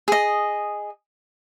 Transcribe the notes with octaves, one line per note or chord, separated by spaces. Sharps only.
G#4 D#5